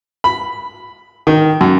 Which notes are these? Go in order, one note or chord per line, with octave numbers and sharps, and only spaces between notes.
B5
D#3
F#2